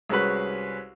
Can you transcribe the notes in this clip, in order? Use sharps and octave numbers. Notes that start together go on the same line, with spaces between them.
C2 G#3 C#4 F#4 B4